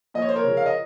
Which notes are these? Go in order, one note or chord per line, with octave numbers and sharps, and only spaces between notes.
A#2 F3 D#5
C#5
C5
A#4 C#5
C#3 F3
F5
D#5